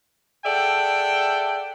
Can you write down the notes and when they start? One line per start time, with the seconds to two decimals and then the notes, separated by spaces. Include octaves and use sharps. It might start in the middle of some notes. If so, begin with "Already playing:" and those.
0.46 G#4 A4 D5 E5 F#5 G5